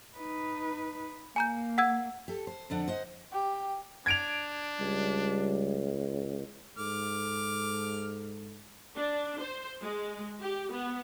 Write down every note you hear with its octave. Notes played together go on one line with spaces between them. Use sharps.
D#4 B4
A#3 G#5 A#5 G6
F#5 E6 G#6
G4 A4
C5
F2 D3 D4 F#5
C5 D#5 F#5
G4
D4 G#6 D7 F7
C#2 G3
G#2 A4 D6 F6
D4
C5
G#3
G4
B3